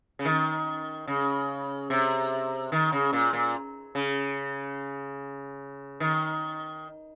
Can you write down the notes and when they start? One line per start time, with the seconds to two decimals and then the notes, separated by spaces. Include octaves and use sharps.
0.19 C#3
0.25 D#3
1.07 C#3
1.90 C3
2.72 D#3
2.92 C#3
3.13 A#2
3.33 A#2
3.95 C#3
6.00 D#3